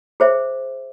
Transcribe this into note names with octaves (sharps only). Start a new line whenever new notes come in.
G#4 C5 E5